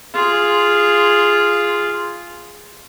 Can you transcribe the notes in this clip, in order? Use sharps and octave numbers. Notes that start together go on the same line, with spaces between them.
F4 G#4